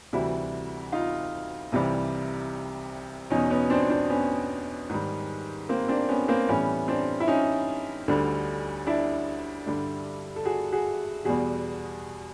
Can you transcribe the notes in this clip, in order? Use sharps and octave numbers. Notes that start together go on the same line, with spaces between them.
D2 C3 E3 G3 E4 F#4
D#4 F4
C2 C3 E3 G3
E2 B2 F#3 C#4 D#4
B3 C#4
C4 D4
C4 D4
B3 C#4
G#2 D#3 G3
A#3 C4
C4 D4
B3 C#4
A#3 C4
A2 E3 G3 B3 C#4
C4 D4
E4
C#4 D#4
D2 D3 G3
D4 E4
G2 D3 G3
A4
F#4 G#4
F#4 G#4
E2 B2 G3 F#4 G#4